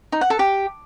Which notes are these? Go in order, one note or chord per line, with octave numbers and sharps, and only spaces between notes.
D#4
F#5
A4
G4